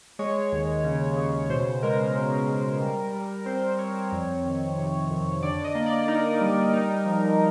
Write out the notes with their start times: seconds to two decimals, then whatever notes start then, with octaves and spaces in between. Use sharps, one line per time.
0.19 G#3 C#5
0.52 D#2
0.84 C#3
1.17 C#3
1.50 B2 C5
1.83 G#3 A#4
2.15 C#4
2.48 G#3
2.81 G3
3.14 G3
3.46 C4 C5
3.78 C4 C#5
4.12 F2
4.44 D#3
4.77 C3
5.10 F2
5.42 D3 D5
5.64 D#5
5.75 A#3
5.86 D5
6.08 D#4 A#4
6.41 G3
6.73 D#4
7.06 F3